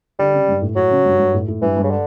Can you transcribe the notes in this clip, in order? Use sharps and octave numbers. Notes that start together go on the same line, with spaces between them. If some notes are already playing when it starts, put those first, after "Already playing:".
D3 G3
C#3
G2
A2
A2 F#3
C#3
G2
G2
A2
A2
G2 E3
G2
C#3
D3